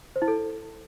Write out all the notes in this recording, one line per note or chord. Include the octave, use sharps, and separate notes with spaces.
C5
E4
A4